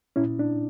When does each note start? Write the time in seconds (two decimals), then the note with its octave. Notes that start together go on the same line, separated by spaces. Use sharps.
0.16 A#2 C#4 E4
0.39 D4